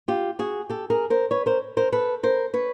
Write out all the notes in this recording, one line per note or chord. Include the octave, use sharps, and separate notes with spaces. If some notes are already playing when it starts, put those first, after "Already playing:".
F4 G4
F#4 G#4
G4 A4
G#4 A#4
A#4 C5
B4 C#5
A#4 C5
A#4 C5
A4 B4
A#4 C5
B4 C#5